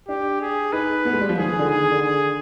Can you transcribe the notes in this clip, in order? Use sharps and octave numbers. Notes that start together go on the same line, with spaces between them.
D4 G4
G#4
D#4 B4
B3
G#3
G3
F3
D#3 G#4
D#3
D3
D#3 G#4
D#3
D3
G#4